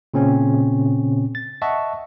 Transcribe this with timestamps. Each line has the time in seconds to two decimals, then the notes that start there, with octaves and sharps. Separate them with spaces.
0.14 A#2 C#3 C4 C#4
1.35 A6
1.62 D#5 E5 F#5 A5 C#6